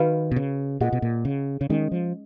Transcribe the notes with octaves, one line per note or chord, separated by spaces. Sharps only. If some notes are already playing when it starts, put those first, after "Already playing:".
Already playing: D#3 F#4 B4 F5
B2
C#3
A#2 F4 G#4 D#5 F#5
B2
A#2
C#3
C#3
D#3 G#3 C#4 G#4 D#5
F3